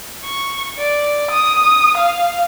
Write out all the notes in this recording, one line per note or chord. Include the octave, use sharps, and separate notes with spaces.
C#6
D5
D#6
F5